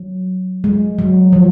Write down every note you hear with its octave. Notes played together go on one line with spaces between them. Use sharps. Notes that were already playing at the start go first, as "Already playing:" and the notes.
Already playing: F#3
G#3
F#3
F3